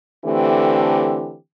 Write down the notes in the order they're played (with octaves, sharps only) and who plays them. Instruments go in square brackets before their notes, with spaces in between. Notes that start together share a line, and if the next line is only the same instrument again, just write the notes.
[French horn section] D3 E3 A3 C4 G4